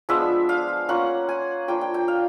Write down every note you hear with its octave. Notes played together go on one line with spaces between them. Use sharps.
F3 G#3 B3 D4 E5
F5
A#3 C#4 F4 F#5
G#5
F3 A#3 D4 F4 G5
G5
G5
F5